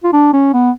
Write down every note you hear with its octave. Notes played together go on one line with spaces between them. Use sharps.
F4
D4
C#4
B3